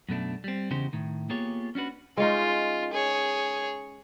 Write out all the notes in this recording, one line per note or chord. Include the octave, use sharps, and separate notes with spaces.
F#2 B2 A3 D4
G3 C4
E2 C#3 D#4 G4 C5
A2 D#3
A#3 B3 F4 G4 G#4 C#5
C#4 D4 F#4 B4
G#3 C#4 D#4 F4
G#4 C#5